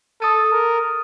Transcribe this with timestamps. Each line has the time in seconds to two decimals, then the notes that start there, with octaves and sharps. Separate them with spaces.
0.21 A4 D#6 A6 D#7
0.52 A#4